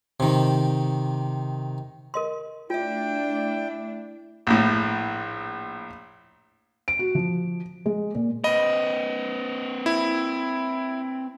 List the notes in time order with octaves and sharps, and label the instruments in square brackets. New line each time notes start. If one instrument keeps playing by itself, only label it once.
[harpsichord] C3 D#3
[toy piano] A#4 D#5 C6
[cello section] A3 D4 [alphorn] E4 [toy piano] F4 E5 [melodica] G5
[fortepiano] A#1 A2
[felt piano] D7
F#4
F3
G#3
A#2
[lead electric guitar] C4 B4 [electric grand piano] D#5
[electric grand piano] E4